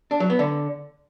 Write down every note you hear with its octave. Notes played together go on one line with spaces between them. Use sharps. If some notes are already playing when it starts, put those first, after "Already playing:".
D4
F#3
B3
D3